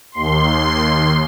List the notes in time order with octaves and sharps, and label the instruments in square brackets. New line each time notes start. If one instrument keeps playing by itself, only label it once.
[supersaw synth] D#2 C6